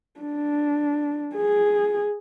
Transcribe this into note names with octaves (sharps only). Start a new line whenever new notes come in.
D4
G#4